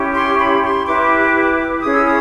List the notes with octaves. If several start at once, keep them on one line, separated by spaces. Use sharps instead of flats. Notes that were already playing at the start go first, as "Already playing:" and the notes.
Already playing: C#4 E4 G4
C6
B5
C6
E4 G4 B4 D6
C#4 E4 G#4 D#6
E6
D#6